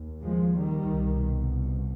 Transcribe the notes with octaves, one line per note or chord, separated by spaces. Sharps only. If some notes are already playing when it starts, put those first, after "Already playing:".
Already playing: D#2
F3 G#3
D#3 G3
C2 B2